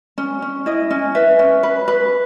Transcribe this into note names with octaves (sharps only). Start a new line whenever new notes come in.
C#4
C#4
E4 D#5
C#4
B4 E5
C#4
B4
B4